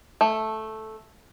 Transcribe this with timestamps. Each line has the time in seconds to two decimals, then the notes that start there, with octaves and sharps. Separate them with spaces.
0.21 A3